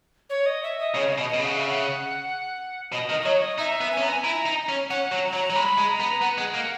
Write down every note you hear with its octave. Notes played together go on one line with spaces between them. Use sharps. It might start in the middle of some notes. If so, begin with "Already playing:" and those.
C#5
D#5
E5
D#5
C#3 C#5
D#5
B2
D#5
B2
C#3
F#5
E5
F#5
B2 D#5
D#3 D#5
D#5
F#3 C#5
D#5
D#4 E5
B3
G#5
C#4
B3 A#5
G#5
E4 A#5
D#4
C#4
C#4 F#5
F#3
A#5
F#3
F#3
G#3 B5
G#3
A#5
B3
B3 F#5
G#3
A#3